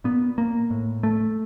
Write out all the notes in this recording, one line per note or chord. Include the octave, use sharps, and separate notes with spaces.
A#2 B3
A#3
A2
A3